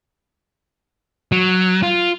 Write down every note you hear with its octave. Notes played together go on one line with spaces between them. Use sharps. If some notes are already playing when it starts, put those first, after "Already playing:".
F#3
F4